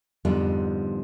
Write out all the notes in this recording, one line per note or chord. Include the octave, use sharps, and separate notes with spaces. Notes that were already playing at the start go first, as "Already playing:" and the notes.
F2 G#2 D3 F3 G3 B3